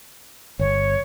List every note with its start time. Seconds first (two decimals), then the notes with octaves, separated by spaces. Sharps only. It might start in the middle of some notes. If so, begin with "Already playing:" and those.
0.59 G1 C#5